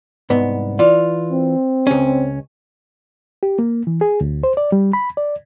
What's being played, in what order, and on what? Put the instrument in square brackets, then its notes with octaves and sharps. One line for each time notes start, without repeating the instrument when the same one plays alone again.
[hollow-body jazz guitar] C2 G#2 B3
[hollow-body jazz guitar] E3 F4 [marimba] D5
[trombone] C4
[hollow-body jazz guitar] C#2 C#4
[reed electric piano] G4
A#3
E3
G#4
D2
C5
D5
G3
B5
D5